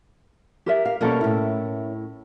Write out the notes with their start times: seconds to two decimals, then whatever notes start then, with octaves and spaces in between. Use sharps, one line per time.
0.66 G4 A#4 E5
0.85 F5
1.01 B2 G3 A#3 C#4 A4 A#4
1.21 A2 E4